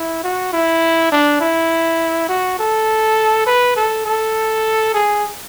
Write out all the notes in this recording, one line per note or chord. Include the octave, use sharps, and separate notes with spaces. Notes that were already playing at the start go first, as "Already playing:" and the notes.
Already playing: E4
F#4
E4
D4
E4
F#4
A4
B4
A4
A4
G#4